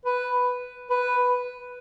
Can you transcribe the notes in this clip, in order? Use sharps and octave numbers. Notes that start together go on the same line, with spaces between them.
B4
B4